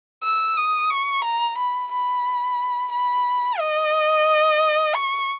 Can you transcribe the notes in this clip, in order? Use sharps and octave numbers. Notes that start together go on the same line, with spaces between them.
E6
D#6
C#6
A#5
B5
B5
B5
D#5
C#6